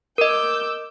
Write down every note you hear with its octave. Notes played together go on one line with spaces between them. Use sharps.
A#4 D#5 D6 E6 G6